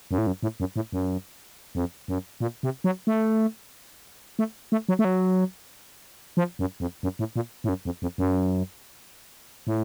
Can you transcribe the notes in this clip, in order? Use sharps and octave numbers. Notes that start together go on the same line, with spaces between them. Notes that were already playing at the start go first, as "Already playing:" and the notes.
F#2
A2
F#2
A2
F#2
A2
F#2
F2
F#2
A#2
C3
F#3
A3
A3
A3
F#3
A3
F#3
F3
F#2
F2
F#2
A2
A#2
A2
F#2
F2
F2
F#2
A2